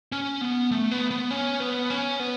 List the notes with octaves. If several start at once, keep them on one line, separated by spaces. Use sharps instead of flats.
C#4
B3
A3
B3
B3
C#4
B3
C#4
B3